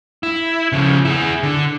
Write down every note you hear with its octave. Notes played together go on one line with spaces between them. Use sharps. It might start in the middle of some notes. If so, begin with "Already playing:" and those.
E4
C#3 F3
E4 G#4
D3